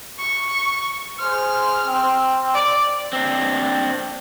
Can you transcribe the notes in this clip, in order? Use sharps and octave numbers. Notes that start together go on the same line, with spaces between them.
C#6
G#4 C5 F6
C4
D5
C4 D4